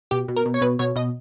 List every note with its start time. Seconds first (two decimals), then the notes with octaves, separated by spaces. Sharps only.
0.11 B2 G4
0.28 B2
0.37 A#4
0.46 B2
0.54 C#5
0.61 B2 B4
0.79 B2 C#5
0.96 B2 D#5